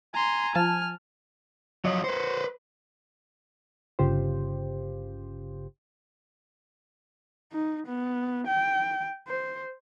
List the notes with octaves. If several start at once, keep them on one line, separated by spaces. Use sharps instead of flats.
G#5 A#5 C6
F3 A5 F6
F3 F#3 D#5
F#4 B4 C5
G1 C#3 F4 G4 C5
D#4
B3
G5
C5